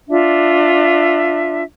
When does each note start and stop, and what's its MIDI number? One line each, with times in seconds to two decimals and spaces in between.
0.09 1.62 62
0.09 1.62 65
0.09 1.62 76